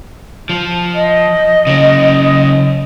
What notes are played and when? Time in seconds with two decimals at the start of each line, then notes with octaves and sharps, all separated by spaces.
0.49 F3
0.95 D#5
1.67 C#3 F#3